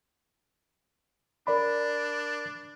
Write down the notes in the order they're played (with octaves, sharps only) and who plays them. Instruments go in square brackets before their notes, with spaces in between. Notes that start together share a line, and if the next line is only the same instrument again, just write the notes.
[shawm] D4 [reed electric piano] A#4 D5 B5